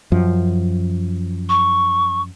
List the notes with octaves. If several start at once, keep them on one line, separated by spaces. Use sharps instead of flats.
F#2 F3
C#6